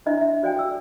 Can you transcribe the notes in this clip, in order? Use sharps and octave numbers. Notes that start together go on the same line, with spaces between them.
D4 E4 C5 D#5 E5 C6
E5
F#4 C5 D5 F5 G5 G#5
A4 E6